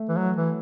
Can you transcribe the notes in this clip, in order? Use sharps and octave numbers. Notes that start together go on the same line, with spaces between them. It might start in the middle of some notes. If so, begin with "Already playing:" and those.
Already playing: A3
E3
F#3
E3